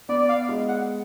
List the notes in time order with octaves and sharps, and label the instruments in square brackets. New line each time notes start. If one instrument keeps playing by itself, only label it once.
[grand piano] B3 [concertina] D5
[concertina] D5
F5
[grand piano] G#3
[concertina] F#5